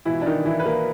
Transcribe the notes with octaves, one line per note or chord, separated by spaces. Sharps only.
C#2 B2 E3 E4
D4
D#3 D#4
E3 E4
B4
A#3 A#4